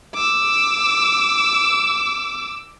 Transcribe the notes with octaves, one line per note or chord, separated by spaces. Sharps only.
D6 E6